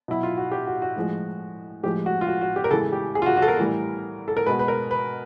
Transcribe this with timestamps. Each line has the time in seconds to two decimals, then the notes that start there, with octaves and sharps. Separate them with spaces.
0.08 B2 F#3 E4
0.23 F4
0.37 F#4
0.52 G4
0.67 F#4
0.82 F#4
0.96 A2 F3 G#3
1.83 A2 F3 G#3 G4
2.06 F#4
2.21 F4
2.27 F#4
2.41 F#4
2.56 G4
2.64 A#4
2.71 C#3 E3 G#3 A4
2.93 G4
3.15 G#4
3.22 F4
3.26 F#4
3.37 F#4
3.42 A4
3.48 A#4
3.59 A2 E3 G3
4.28 A4
4.37 A#4
4.46 B2 G#3 B4
4.59 B4
4.68 A#4
4.91 B4